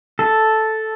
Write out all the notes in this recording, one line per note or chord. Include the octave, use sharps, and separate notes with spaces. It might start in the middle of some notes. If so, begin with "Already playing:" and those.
A4